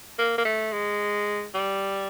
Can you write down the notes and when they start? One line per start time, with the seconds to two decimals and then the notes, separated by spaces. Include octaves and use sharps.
0.18 A#3
0.38 A#3
0.45 A3
0.73 G#3
1.54 G3